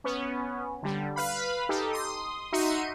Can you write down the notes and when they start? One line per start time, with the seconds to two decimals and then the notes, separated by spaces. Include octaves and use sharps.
0.04 B3 C#4
0.83 D3 G3
1.16 B4 F5 B5
1.69 D#4 G4 A4
1.92 C6 D#6
2.52 D#4 F#4 E5 C6 C#7 D#7